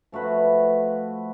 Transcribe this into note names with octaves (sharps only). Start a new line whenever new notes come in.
F3 A3 F#4 B4